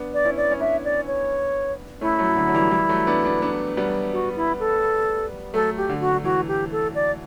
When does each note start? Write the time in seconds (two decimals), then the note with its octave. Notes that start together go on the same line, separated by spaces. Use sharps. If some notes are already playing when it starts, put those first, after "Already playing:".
Already playing: B3 D4
0.14 D5
0.25 C#4 E4
0.37 D5
0.51 C#4
0.60 B3 D4 E5
0.84 D5
1.07 C#5
2.01 A3 C#4 E4
2.18 F#3 A3
2.36 D3 F#3
2.48 F#3
2.54 E3 G3
2.71 E3 G3
2.89 F#3 A3
3.07 B3 D4
3.25 B3 D4
3.42 B3 D4
3.77 G3 B3
4.13 F#4
4.36 E4
4.60 A4
5.54 F#3 A3 A4
5.77 G4
5.89 D3
6.01 F#4
6.12 D3
6.24 E3 F#4
6.48 G4
6.72 A4
6.95 D5